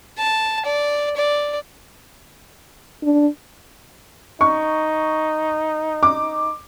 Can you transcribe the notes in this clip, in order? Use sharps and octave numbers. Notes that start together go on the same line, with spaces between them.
A5
D5
D5
D4
D#4 C#6
D6